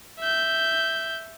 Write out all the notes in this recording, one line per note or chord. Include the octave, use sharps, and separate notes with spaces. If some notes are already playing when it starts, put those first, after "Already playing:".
E5 G6